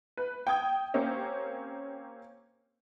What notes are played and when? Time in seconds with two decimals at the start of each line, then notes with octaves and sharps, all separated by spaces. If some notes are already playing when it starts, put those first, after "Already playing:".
0.17 B4
0.47 G5 D#6 G#6
0.94 A#3 C4 C#4 G4